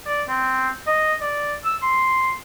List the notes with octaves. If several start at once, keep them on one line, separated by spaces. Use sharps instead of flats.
D5
C4
D#5
D5
E6
C6